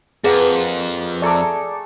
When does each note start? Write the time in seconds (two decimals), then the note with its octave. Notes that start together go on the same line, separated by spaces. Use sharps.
0.24 F2 A#3 G#4 B4 F#5
1.22 A3 G#4 A4 D5 A#5 D6